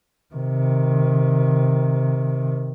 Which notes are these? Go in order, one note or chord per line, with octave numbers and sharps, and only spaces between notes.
C3 D#3